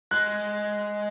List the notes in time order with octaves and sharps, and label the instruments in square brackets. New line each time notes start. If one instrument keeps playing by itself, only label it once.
[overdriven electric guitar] G#3 [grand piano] F#6